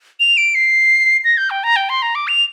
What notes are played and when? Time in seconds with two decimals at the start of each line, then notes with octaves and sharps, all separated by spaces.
0.20 F7
0.37 D7
0.55 C7
1.24 A#6
1.37 G6
1.50 G5
1.64 A#5
1.76 G5
1.89 C6
2.02 A#5
2.15 D6
2.28 F7